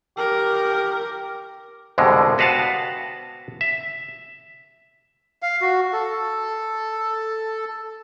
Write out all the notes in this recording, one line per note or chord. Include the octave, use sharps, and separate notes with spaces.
G4 A#4
C2 F2 B2 D3 G#3
B3 F#4 B4 F5 F#5 A5
E5
F5
F#4
A4